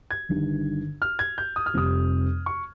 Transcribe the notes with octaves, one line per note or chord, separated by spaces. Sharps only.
G#6
G1 G2 D#3
F6
G#6
G6
D#6
F6
F1 F2 C3 G3 D#6
C#6